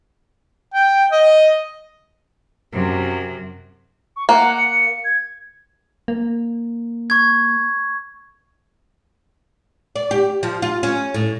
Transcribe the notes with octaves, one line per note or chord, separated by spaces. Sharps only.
G5
D#5
F#2 C3
C#6
A#3 F#5
C#7
G#6
A#3
C#6 G#6
D5
G4
F3
F4
C#4
A2